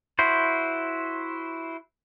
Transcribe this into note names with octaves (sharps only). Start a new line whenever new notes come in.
E4 F#4 C5